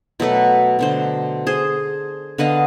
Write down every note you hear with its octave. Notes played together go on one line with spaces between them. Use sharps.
B2 F#3 A3 B4
B2 D3 C5
G#4 C5
D3 B3 D#5 F5